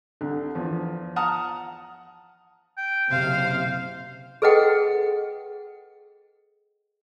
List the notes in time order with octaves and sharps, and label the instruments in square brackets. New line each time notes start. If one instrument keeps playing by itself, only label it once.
[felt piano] C2 D3
E2 F3
F#5 A5 A#5 D#6 F6
[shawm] G5
[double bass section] F#1 C3 [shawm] C5 [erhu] F5
[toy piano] G#4 A4 B4 D#5 F#5 G5